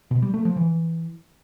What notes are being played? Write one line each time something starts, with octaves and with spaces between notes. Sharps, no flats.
B2
G3
A3
F3
E3